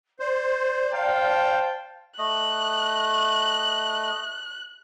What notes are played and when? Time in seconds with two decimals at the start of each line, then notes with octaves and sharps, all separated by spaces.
0.20 C5 D5
0.93 C5 F5 G5 A5
2.19 A3 D#5 F#6